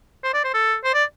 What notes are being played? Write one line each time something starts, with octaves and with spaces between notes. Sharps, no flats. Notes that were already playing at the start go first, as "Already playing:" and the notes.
C5
D5
C5
A4
C5
D5